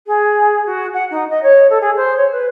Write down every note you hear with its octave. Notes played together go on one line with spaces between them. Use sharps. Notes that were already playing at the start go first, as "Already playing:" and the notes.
G#4
F#4
F#5
D#4
D#5
C#5
A4
G#4
C5
C#5
B4